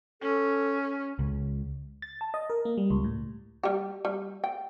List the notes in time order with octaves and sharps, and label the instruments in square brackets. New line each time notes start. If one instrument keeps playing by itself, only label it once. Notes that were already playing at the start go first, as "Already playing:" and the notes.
[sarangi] C#4 [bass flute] A4
[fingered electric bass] C#2
[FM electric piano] A6
A5
D#5
A#4
A#3
G3
C#2
A2
[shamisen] G3 G4
G3
G5